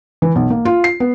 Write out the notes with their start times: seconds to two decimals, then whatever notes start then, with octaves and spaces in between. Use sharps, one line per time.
0.22 E3
0.35 B1
0.50 A#3
0.65 F4
0.84 C7
1.00 B3